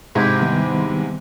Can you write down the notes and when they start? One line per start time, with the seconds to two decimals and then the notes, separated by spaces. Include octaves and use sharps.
0.15 G#2 C3 G#3 E4 G4
0.41 D#3 G3 B3